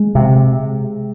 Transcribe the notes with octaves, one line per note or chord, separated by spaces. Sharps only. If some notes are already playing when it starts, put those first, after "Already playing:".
Already playing: G#3
C3